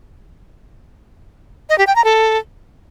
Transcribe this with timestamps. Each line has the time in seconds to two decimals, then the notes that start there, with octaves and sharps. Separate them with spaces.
1.70 D#5
1.78 G4
1.87 G5
1.96 A#5
2.04 A4